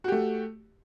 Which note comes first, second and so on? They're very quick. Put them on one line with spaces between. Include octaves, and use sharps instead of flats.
F#4 G4 A3